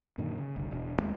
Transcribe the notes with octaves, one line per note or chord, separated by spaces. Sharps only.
F#2 A#2 D3 D#3
C#3
F#1 C2 D3
E1 B2 D4
D#2 G#3 C4